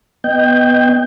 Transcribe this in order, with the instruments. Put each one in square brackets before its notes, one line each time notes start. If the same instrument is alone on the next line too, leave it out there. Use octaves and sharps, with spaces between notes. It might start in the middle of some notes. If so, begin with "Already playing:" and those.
[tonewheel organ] B3 D#5 G5 G6